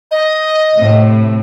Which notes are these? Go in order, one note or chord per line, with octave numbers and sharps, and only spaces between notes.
D#5
A2 C3